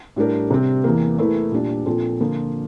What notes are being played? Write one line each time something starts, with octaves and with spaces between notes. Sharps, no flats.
A2 G3 D4 G4 A#4
C3 G3 C4
E2 E3 A#3
E2 E3 A3 E4 A#4
A#2 G3 D4
A#2 F3 C4 F4 A4
D3 F3 A#3 F4